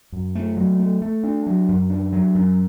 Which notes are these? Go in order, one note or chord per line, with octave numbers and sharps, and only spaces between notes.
F#2
A3
F#3
A3
A3
D4
F#3
F#2
D4
F#3
F#2